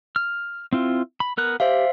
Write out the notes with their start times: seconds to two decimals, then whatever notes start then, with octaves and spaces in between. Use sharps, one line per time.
0.16 F6
0.73 C4 E4 F4
1.20 B5
1.37 B3 A#4 F#6
1.60 G4 C5 E5 F5